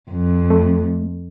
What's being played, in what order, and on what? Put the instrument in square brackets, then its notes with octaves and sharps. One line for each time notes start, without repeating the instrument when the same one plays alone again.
[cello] F2
[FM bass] A3